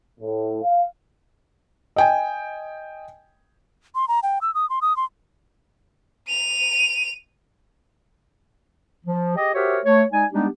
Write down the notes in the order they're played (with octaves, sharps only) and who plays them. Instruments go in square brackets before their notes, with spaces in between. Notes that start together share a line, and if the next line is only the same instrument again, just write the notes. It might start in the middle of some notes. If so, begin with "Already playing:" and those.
[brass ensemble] A2
F5
[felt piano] D#5 G5 G#5
[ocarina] C6
A#5
G5
E6
D#6
C6
D#6
C6
[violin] D#7 F7
[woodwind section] F3
G4 G#4 D#5
F#4 G4 A#4 C5 C#5 E5
A3 C#5
G#3 D#4 D5 G#5
G3 G#3 B3 D4 D#4 G4